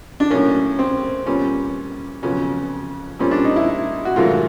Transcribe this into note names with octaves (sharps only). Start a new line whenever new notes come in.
D4
A2 F#3 A#3 C#4
C4
A#2 G3 B3 C#4
F2 C#3 F#3 B3 C#4
A#2 G3 C4 C#4
D4
D#4
E4
F#4
G#2 D#3 F#3 A3 F4